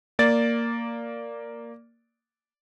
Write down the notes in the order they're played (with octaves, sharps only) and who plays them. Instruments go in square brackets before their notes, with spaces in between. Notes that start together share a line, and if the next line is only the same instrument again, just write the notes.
[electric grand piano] A#3 D5 A6